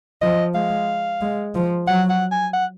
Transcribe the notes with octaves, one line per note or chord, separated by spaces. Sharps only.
F3 D#5
G#3 F5
G#3
F3
F#3 F#5
F#5
G#5
F#5